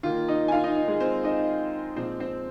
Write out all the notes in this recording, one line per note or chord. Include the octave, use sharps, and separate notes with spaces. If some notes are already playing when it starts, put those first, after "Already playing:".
D#3 A#3 F4
D#4 D#5
G#5
F4 F5
D#4 D#5
D#4
G#3 G#4
C4 C5
D#4 D#5
A#2 F3 G#3 C4 C5
C4 C5